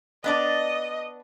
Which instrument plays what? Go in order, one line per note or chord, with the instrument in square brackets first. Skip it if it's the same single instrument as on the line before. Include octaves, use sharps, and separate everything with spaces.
[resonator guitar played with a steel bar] B3 D4 D5 [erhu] D#5